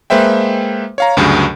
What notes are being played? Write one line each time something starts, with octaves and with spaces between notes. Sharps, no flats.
G#3 A#3 B4 C5 E5 G5
C#5 F5 A#5
D2 G2 C#3 F#3 G#4